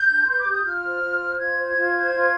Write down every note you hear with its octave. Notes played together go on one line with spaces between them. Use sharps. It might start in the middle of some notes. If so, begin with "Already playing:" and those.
Already playing: G6
D4
B4 C6
D6
G4
D#6
F4 F6
C5
F4
C5
F4 G#6
C5
F4
C5
F4